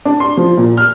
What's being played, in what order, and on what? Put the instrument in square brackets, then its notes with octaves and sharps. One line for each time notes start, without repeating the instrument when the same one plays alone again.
[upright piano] D4
C6
F3
A#2
F6